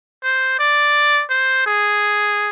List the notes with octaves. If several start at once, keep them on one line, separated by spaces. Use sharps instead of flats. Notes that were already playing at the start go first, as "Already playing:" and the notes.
C5
D5
C5
G#4